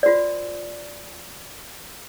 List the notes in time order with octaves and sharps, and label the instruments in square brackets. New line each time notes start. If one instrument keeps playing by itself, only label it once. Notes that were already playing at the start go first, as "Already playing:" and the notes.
[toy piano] F4 F#4 C5 D5